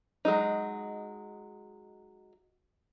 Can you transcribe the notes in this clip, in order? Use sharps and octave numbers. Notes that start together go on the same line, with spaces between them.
F#3 G#3 D#4